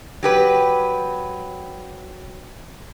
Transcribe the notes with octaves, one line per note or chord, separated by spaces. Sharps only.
F#3 G4 B4